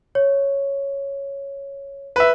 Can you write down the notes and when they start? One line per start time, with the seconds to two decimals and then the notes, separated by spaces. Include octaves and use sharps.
0.15 C#5
2.16 B4 E5